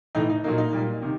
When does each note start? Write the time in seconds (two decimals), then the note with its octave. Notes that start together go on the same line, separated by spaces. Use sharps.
0.15 A2 E3 A3 D#4
0.29 D#4
0.44 A#2 F#3 A#3 D#4
0.58 D#4
0.72 A#2 G3 A#3
1.02 C3 D#3